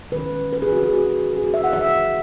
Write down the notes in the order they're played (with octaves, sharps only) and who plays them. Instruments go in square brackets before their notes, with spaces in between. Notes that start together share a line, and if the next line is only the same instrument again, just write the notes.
[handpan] D#3 G#3 C#4 B4
B4
G#4
F#4
G#4
F#4
G#4
F#4
E5
F#5
C#3 E3 G#3 E5